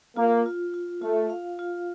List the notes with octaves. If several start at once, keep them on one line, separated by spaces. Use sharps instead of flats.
A#3 F4
F4
F4
A3 F4
F5
F4